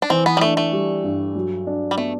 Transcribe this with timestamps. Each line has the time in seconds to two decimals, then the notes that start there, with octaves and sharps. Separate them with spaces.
0.02 D4
0.10 E3 C4
0.26 B3
0.37 G3
0.41 A3 D4
0.57 A3
0.73 G3
1.04 G2
1.36 F#3
1.67 D4
1.91 G3
1.97 A3 B3